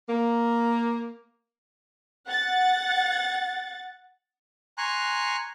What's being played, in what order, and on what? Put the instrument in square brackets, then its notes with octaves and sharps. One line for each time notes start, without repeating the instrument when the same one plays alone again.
[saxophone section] A#3
[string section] F#5 A6
[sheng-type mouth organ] G#5 A#5 C6 C#6 F#6